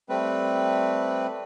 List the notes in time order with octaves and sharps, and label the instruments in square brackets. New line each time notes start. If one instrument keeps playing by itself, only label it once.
[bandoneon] G3 A3 C4 B4